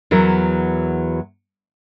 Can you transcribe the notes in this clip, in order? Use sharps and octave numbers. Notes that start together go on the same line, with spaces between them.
E2 E3 F#3 A#4